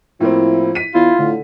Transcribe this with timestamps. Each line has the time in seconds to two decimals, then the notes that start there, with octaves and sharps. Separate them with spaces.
0.20 A2 F3 A#3 C4 E4
0.75 B6 D#7
0.94 E2 E4 F4
1.19 A2 D3